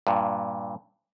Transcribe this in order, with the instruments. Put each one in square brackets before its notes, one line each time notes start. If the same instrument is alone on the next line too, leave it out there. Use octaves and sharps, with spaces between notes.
[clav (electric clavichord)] G2 A#2